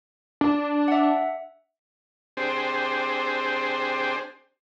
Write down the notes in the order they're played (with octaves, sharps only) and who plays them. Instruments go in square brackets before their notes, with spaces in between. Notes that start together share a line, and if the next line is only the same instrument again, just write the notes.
[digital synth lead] D4
[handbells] E5 F#5
[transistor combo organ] C4 D4 G4 G#4 C5